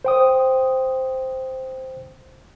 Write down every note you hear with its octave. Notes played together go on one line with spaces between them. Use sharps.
C5 G5 D#6